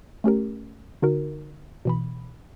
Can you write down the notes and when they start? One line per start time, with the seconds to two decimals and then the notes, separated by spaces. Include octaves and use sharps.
0.24 A3 C#4 G4 A#4
1.02 D3 D#4 F#4 A#4
1.85 B2 E3 B5